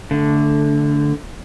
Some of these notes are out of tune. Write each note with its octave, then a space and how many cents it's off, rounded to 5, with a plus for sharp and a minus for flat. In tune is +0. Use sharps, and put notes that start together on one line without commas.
D3 -10 A3 +0